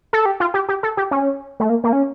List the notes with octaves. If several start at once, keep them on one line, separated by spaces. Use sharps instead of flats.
A4
G4
F4
G4
G4
A4
G4
C#4
A3
A#3
A#3
C#4